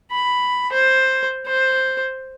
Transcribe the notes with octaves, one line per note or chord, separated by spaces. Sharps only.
B5
C5
C5